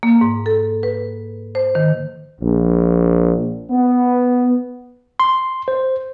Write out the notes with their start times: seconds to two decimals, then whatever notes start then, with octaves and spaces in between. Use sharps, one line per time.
0.03 A#3
0.21 G#2
0.46 A4
0.83 B4
1.55 C5
1.75 D#3
2.41 A#1
3.71 B3
5.20 C6
5.68 C5